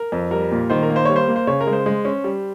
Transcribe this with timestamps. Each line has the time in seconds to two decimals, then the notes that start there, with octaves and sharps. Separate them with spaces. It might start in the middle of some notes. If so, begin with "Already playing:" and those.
Already playing: A#4
0.12 F2
0.31 G3 A#4
0.51 A#2
0.70 D#3 C5
0.83 A#4
0.90 A#3
0.96 C5
1.05 G3 C#5
1.16 C5
1.28 A#3
1.36 C5
1.47 C#3 C#5
1.61 A#4
1.67 G#3
1.73 C5
1.86 G#3
2.05 C#4
2.24 G3